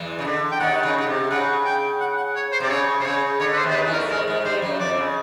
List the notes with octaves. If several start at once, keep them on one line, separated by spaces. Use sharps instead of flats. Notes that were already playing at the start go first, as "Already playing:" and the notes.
Already playing: E2 E3
C#3
D3
G5
D#2 D#3 F#5
C#3
C#3
C3
C#3 F#5
G5
F#5
F#5
C#5
C5
C3 D5
C#3 C#5
C3 C5
C#3 C#5
D3 C#5
B4
C5
D#2 D#3
C5
B4
E2 E3
A#4
A3
G#2 G#3 A#4
G#2 G#3
G2 G3 C5
F#2 F#3
F2 F3 D5
C#3